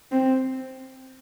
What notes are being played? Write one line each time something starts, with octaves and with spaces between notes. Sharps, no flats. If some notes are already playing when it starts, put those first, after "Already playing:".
C4